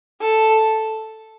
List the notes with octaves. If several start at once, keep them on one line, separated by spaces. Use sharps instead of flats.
A4